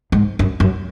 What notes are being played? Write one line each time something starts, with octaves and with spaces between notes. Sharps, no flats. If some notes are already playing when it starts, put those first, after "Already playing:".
G#2
F#2
F#2